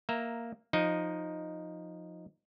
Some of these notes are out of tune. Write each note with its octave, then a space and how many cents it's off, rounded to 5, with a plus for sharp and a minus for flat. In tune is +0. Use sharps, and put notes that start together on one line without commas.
A#3 +0 E5 +0 A#5 -5
F3 +15 D#4 +0